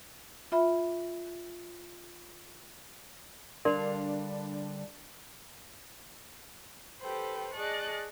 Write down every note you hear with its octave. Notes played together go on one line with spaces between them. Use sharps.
F4 E5 B5
D3 G3 D4 A#4 D5 F5 C6
G4 A4 B4 C5 G5
G#4 D5 D#5 A5 C#6 F#6